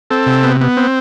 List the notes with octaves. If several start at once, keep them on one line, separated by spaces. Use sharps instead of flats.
C4 A4
C3
B3
B3
C4